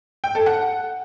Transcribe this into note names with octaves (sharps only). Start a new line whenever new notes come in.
G5
A4
F#5